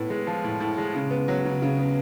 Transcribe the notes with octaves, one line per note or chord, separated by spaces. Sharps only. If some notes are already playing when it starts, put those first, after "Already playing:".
Already playing: A2 B3
G#3
F3
A2
A2
G#3
C#3
B3
F#3
C#3
C#3
B3